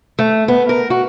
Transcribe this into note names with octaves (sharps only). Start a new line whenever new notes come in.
A3
B3
A#4
F#4